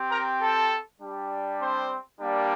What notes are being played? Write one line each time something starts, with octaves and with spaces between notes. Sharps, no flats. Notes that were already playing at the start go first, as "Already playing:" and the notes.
Already playing: C4 G4
A#4 A#5
A4 A5
G3 D4 G4
C4 C5
G3 A#3 D4 G4